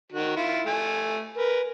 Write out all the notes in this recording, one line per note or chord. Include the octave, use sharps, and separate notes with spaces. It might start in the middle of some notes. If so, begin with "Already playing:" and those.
D#3 F#4
E4 F4
A3 G#5
A#4 B4